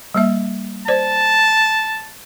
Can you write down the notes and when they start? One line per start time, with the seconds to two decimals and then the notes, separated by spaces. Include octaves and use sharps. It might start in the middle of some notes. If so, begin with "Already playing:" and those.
0.14 G3 A#3 E5
0.88 C5 D5 A5